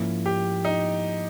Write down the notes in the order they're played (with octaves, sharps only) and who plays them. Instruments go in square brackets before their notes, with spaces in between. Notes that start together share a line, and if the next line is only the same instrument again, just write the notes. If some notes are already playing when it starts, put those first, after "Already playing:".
Already playing: [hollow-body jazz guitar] G#2 F3 A#3 C#4 E4
[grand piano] G4
D#4